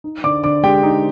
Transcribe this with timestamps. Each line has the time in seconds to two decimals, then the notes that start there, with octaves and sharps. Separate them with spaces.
0.04 D#4
0.24 D3 D5 D6
0.44 D3 D5 D6
0.63 G#3 G4 G5
0.83 D#4